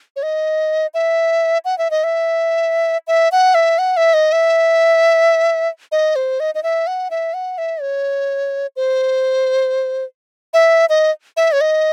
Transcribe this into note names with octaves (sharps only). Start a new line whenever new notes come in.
C#5
D#5
E5
F#5
E5
D#5
E5
E5
F#5
E5
F#5
E5
D#5
E5
D#5
C5
D#5
D#5
E5
F#5
E5
F#5
E5
C#5
C5
E5
D#5
E5
C#5
D#5